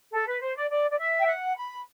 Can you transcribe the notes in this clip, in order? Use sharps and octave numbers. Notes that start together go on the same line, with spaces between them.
A4
B4
C5
D5
D5
D5
E5
G5
F#5
B5